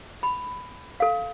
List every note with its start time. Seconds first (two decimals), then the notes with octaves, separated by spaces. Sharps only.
0.23 B5
1.00 A4 F5